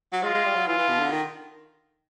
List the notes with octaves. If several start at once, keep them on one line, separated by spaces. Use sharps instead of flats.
F#3
G#3 F4
G#3
G3
F#3
E3 F4
E3
B2
D3
D#3